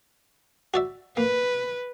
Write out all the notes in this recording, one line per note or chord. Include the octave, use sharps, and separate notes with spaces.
F#4 D5 E5
A#3 B4